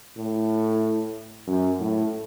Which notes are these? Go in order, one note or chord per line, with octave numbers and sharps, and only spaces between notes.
A2
F#2
A2